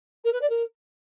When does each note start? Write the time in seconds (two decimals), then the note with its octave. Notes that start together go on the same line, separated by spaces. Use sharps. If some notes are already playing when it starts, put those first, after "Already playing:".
0.24 A#4
0.33 B4
0.41 D5
0.49 A#4